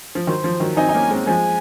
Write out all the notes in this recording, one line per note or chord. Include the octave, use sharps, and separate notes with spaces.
F3
D#3 F#3 C5
F3
D#3 F#3
C4 D#4 G#5
D#4
A#3 C#4
G#3 C4
F3 G#3 G#5